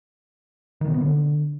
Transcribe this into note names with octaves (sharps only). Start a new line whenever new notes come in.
D#3
B2
B3
D3